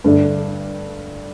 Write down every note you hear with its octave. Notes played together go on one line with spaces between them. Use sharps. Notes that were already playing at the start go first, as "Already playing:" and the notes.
G2 D3 A3 D4